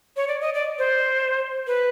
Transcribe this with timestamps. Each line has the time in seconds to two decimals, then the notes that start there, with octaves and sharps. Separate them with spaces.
0.16 C#5
0.28 D5
0.41 D#5
0.54 D5
0.79 C5
1.67 B4